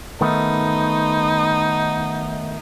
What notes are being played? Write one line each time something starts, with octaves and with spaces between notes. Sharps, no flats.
D#3 A3 B3 D#4